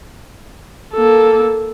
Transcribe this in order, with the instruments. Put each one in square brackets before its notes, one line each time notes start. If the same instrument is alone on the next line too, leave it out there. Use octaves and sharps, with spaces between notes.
[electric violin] A#3 A4